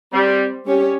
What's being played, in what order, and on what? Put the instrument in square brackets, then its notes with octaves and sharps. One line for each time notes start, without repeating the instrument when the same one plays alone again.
[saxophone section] G3 [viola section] C4 G4 C5
[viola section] G3 C#4 G4 C#5